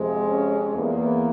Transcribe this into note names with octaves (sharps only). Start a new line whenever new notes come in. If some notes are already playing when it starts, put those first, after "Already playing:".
Already playing: F2 C3 F3 G#3
C#4
E2 E3 A#3